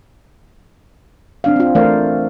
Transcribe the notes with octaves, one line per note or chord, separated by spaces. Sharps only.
C4 D4 F5
C4 F4
E3 A3 A#4 C5 D5 F5